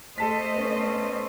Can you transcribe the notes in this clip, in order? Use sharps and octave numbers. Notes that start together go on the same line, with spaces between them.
A3 A4 C5 D#5 A5 B6
B3 C#4